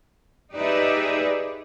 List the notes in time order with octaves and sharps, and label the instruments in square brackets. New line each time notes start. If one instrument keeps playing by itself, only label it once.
[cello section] D#4 G4 G#4 B4 D5 E5